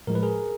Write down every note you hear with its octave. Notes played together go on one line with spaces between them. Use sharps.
A2 F3 G#3 A#4
B4
G#4 A#4